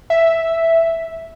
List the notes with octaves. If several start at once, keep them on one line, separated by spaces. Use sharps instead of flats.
E5